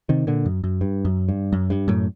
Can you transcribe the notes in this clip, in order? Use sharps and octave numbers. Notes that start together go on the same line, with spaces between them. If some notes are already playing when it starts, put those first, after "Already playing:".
C3 D#3
A#2 D3
F#2
F#2
G2
F#2
G2
F#2
G2
F#2 A2